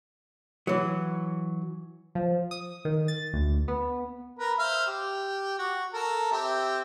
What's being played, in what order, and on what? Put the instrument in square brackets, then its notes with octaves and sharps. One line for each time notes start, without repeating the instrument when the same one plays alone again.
[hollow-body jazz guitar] E3 F#3
[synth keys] F3
D#6
D#3
A6
D2
B3
[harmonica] A#4 B4
C5 E5 F5
G4
F#4
A4 A#4
C4 G4 E5